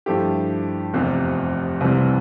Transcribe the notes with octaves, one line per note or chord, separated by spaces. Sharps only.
G2 F3 A3 E4 G4
F1 E2 C3 F3
C2 C3 E3 G3 C4